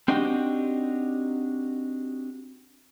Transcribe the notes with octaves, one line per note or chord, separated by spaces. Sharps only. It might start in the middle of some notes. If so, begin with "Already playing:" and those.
C4 D4 D#4 F#4 G4 G5